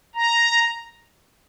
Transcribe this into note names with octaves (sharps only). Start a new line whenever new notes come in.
A#5